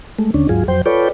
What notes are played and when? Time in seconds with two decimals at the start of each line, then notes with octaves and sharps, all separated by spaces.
0.19 G#3 A3
0.34 D#2 D3 C#4 D4
0.49 D#2 G#2 F#3 F4 G#4
0.68 F2 F#3 C5 G5
0.86 F4 A4 B4 C#5 D5 G5